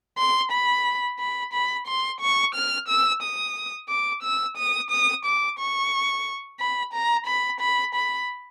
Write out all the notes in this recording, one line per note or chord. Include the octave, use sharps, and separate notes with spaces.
C6
B5
B5
B5
C6
C#6
F6
E6
D#6
D6
E6
D#6
D#6
D6
C#6
B5
A#5
B5
B5
B5